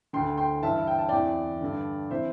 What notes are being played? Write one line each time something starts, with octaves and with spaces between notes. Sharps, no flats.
D2 D3 G5 C6
G5 C6
G2 E3 E5 A5
G5
A5
E2 C3 E3 D5 G5
G2 D3
C3 E3 C5 E5